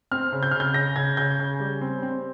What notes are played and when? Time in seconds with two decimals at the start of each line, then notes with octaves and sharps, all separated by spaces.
0.11 C4 F6
0.32 C#3
0.43 G6
0.51 C#3 F6
0.60 G6
0.74 C#3 A#6
0.96 C#3 G#6
1.17 C#3 G6
1.39 C#3
1.60 G3
1.81 C4
2.03 C4